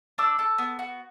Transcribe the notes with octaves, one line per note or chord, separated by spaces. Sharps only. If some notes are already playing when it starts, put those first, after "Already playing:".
D4 D6 E6
A4
B3
F#4